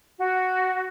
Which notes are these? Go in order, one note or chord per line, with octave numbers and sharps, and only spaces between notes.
F#4